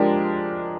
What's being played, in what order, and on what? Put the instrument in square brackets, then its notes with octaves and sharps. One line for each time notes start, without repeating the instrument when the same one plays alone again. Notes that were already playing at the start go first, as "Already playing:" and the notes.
Already playing: [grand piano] F3 G#3 D4 G4 A#4